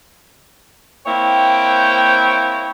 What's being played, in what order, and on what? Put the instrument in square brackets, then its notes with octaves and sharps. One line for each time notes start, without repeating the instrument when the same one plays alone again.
[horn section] A#3 C4 E4 C#5 G5